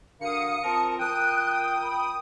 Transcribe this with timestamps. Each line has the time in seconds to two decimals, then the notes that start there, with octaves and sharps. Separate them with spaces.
0.21 D3 F#4 A#4 F5 D#6 C#7
0.64 C4 F4 A#4 A5
0.99 F3 A#4 G5 D#6 F#6
1.83 B5